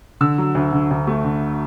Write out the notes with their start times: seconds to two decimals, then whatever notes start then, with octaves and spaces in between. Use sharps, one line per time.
0.21 D3 E6
0.38 F#3
0.55 D2
0.72 D3
0.91 D2
1.07 A3
1.24 D3